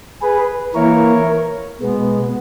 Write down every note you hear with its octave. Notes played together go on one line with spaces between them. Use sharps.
G#4 B4
E3 A#3 E4 A#4 C#5
B2 G#3 B3